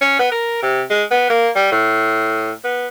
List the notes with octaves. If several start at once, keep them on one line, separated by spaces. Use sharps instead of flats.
C#4
B3
A#4
C3
G#3
B3
A#3
G3
A2
B3